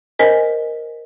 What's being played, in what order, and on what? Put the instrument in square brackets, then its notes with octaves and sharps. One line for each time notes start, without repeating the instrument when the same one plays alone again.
[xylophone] A#4 C5 D#5 G#5 B6